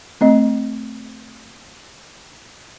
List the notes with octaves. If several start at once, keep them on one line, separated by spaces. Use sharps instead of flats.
A3 C4 D#5